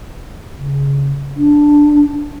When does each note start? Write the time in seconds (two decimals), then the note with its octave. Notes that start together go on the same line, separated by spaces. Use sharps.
0.58 C#3
1.37 D4